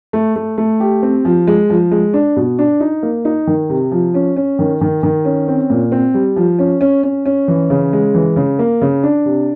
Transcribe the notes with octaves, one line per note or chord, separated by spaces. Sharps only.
A3
A3
A3
G4
C4
F3
G#3
F3
G#3
D4
B2
D4
D#4
A#3
D#4
D#3
C3
F3
C#4
C#4
D#3
D#3
D#3
C#4
C4
A#2
C4
G3
F3
C#4
C#4
C#4
C#4
E3
C#3
G#3
E3
C#3
A#3
C#3
D4
C3